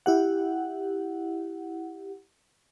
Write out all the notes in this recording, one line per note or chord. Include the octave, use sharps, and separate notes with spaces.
E4 G4 F#5